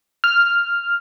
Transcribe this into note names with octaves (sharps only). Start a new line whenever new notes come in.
F6